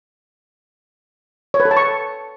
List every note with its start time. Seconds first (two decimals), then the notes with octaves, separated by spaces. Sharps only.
1.54 C#5
1.60 B4
1.65 A4
1.71 A5
1.77 C#6